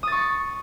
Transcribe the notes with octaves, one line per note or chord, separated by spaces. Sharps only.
C#6 D#6 A6